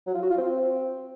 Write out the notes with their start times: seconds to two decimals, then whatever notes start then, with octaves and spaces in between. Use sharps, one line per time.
0.07 F#3
0.15 F4
0.22 F#4
0.30 F4
0.38 C4